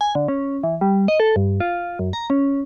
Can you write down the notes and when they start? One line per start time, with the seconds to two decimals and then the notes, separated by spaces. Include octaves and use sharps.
0.01 G#5
0.15 D3
0.28 C#4
0.63 E3
0.81 G3
1.08 D#5
1.20 A4
1.36 G2
1.60 F4
1.99 F#2
2.13 A#5
2.30 C#4